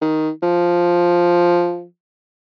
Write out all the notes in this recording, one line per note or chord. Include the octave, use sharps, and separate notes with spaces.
D#3
F3